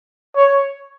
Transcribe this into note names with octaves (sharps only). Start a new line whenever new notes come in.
C#5